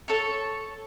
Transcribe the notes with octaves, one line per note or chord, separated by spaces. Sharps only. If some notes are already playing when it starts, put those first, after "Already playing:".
A4 C#5